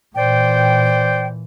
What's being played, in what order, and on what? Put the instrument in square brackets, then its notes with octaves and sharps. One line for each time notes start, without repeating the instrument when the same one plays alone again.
[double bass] A#2 E3 [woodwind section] C5 D5 G5